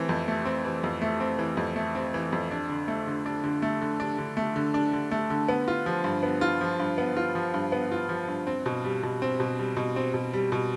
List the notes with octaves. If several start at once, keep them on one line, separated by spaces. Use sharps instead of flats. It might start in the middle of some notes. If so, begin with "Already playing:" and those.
Already playing: E3 A3 C4
F2
A3
C4
E3
F2
A3
C4
E3
F2
A3
C4
E3
F2
D4
D3
A3
D3
D4
D3
A3
D3
D4
D3
A3
D3
D4
D3
A3
D3
B3
F4
F3
G2
B3
F4
F3
G2
B3
F4
F3
G2
B3
F4
F3
G2
C4
B2
G3
B2
C4
B2
G3
B2
C4
B2
G3
B2